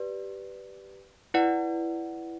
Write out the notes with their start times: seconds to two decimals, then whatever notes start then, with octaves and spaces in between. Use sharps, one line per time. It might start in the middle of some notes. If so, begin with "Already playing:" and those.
Already playing: G4 B4 D5
1.34 E4 B4 D5 F#5